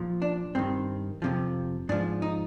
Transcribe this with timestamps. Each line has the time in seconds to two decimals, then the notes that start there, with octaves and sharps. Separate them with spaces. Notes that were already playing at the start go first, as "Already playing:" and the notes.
Already playing: A#2 F3
0.22 D4
0.55 G2 D#3 C4
1.22 F2 C3 F3
1.89 G#2 F3 D4
2.22 D#4